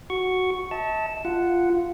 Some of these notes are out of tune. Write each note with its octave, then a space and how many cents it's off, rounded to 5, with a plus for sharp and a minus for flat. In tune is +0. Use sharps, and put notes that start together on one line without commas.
F#4 +0 C#6 +0
E5 -45 A5 +0
F4 -10 F#5 +0